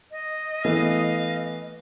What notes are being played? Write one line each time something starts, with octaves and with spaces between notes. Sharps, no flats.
D#5
E3 A3 B3 F5